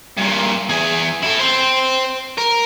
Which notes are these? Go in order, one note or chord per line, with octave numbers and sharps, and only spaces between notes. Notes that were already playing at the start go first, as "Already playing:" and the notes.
G2 A#2
E2 G#4
E4 A4
C5 G5
A#4